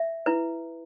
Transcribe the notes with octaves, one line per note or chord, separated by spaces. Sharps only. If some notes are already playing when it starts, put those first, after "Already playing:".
Already playing: E5
E4 B4